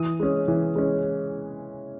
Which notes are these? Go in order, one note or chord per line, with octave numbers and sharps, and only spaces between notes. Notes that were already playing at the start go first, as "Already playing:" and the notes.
Already playing: E3 D#6
G#3 C#4
E3
G#3 C#4